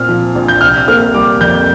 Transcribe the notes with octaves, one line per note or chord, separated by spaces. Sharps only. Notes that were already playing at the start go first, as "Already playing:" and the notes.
Already playing: A#2 C4 F6
F3
A#1
G6
C3 F6
A#3 F6
G3 D6
F2 G6